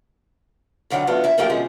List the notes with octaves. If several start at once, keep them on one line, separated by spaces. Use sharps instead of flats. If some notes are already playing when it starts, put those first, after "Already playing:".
F2 D3 D#3 F#3 F#5
F3 A3 B3 D4 F4 F#4
E4 E5
F3 F#3 A3 A#3 F4 G4
D2 B2 F3 G#3 C#4